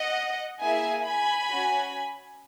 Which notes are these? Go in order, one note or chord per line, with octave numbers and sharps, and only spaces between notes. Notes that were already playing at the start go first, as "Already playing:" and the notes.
Already playing: D#5 F#5
A#3 E4 G#4 E5 G#5
G#5 B5
C#4 F#4